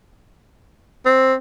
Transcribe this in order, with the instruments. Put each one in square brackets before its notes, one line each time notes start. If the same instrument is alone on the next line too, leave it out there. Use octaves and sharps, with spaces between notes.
[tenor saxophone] C4